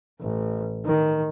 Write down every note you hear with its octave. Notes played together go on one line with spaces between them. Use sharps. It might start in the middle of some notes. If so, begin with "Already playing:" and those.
A1
D#3